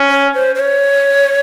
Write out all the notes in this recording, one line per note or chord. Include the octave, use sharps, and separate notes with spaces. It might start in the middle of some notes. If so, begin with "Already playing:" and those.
Already playing: C#4
C#5
C5
C5
C#5